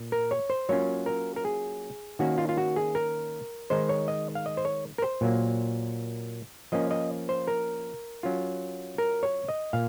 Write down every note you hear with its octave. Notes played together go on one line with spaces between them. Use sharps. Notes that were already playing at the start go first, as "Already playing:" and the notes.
Already playing: A#2
A#4
C#5
C5
F#3 A#3 C#4 F4 C#5
A#4
A#4
G#4
D#3 A#3 C#4 F#4
F4
F4
F#4
G#4
A#4
D#3 G#3 D#4 C5
C#5
D#5
F5
D#5
C5
C#5
A#4
C5
A#2 F#3 A#3
F3 A#3 C#4 D#5
D#5
C5
A#4
F#3 C#4 F4
A#4
C#5
D#5
A#2 F5